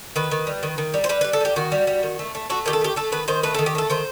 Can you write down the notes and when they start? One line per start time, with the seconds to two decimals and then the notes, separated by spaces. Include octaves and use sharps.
0.16 D#3 B4
0.31 D#3
0.47 G3
0.63 D#3
0.78 D#3
0.94 G3
1.04 C5
1.09 G3 B4
1.21 B4
1.24 G3
1.33 A4
1.41 G3 G4
1.56 D#3 F#4
1.72 G3
1.87 G3
2.03 D#3
2.19 A3
2.35 A3
2.50 A3 F#4
2.66 D#3 G4
2.73 A4
2.81 A3 G4
2.96 A3 A4
3.12 D#3 B4
3.28 D#3 C5
3.43 A3 B4
3.54 A4
3.59 D#3
3.66 G4
3.75 A3 A4
3.90 D#3 C5